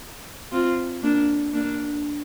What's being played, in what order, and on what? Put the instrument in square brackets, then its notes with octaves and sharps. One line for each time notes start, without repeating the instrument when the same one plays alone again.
[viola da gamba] C4 F4
A#3 D4
A#3 D4